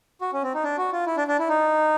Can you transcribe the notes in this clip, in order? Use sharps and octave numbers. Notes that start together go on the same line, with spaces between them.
F#4
C#4
C4
D#4
D4
F#4
F4
E4
D4
D4
E4
D#4